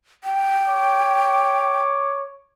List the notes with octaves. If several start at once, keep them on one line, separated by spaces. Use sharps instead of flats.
G5
C#5 D6